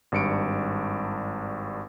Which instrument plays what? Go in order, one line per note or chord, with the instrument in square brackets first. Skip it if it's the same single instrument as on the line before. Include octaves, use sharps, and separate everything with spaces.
[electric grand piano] G#1 G2 C#7 D7